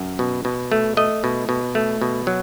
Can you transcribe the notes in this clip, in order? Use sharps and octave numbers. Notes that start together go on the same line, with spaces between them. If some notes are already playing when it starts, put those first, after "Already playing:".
Already playing: F#2
B2
B2
A3
A3 D#5
B2
B2
A3
B2
F#3